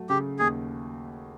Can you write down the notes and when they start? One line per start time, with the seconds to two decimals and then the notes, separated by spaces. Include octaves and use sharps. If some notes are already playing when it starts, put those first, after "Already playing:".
Already playing: F#3 A3
0.09 C#3 G4
0.39 D#2 G#4